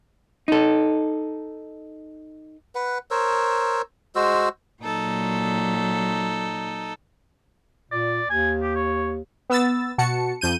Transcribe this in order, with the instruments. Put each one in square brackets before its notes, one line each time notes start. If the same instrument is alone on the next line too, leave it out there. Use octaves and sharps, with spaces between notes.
[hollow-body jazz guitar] D#4 A4
[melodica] B4 F#5
A#4 C5 C#5 E6
G#3 F#4 C5 E6
[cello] A#2 F#3 [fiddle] D#4 A4
[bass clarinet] A#2 [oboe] D5
[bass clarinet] D#2 [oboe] G#5
[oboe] G4
C#5
[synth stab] B3 E6 A6
B2 F#4 A5 C#7
F2 G6 D#7